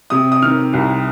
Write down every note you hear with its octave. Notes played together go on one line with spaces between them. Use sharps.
C3 D#6
D#6
D#3 F6
C2